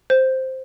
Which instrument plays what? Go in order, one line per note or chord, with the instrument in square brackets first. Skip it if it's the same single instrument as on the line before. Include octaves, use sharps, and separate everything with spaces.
[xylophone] C5